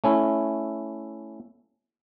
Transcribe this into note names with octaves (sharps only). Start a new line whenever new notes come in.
A3 C#4 E4